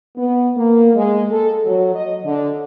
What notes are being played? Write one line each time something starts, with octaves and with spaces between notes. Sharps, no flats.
B3
A#3
G#3
A4
F#3
D#5
D3